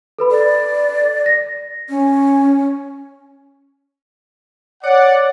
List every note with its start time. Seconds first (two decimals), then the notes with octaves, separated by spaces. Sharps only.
0.19 A4 B4 B5
0.31 D5
1.26 A#6
1.89 C#4
4.84 C#5 D5 F#5